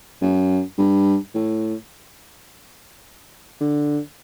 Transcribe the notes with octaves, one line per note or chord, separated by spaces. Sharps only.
F#2
G2
A2
D3